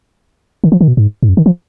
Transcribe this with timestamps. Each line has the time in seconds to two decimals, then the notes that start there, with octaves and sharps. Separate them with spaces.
0.64 D#3
0.72 F3
0.81 D#3
0.88 B2
0.97 G#2
1.23 G#2
1.29 F#2
1.37 D#3
1.46 F3